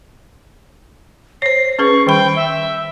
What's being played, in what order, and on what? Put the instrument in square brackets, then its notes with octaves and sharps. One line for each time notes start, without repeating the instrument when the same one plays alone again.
[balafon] C5 C#5 [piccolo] C7
[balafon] C#4 G#4 B4 [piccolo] C#6
[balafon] D#3 G3 B5 [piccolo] G5
[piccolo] E5